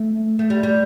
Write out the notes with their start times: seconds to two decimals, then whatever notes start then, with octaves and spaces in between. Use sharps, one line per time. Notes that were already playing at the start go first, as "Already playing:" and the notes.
Already playing: A3
0.39 A3
0.50 G3
0.63 G3